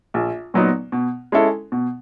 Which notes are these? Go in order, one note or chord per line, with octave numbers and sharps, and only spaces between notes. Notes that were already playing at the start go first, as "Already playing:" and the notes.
A#1
A#2 F#3 B3 D#4
B2
G#3 C#4 E4 A4
B2